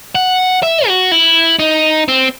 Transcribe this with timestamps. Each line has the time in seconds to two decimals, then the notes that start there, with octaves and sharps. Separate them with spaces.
0.15 F#5
0.63 E5
0.87 F#4
1.12 E4
1.59 D#4
2.08 C4